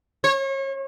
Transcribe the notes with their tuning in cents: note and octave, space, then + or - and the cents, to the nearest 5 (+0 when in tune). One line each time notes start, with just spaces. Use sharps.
C#5 -35